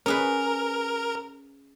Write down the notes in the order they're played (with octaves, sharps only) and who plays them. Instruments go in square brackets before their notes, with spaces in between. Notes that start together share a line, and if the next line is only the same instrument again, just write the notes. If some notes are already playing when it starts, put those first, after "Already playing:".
[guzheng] C#4 G#4 B4 [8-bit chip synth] A#4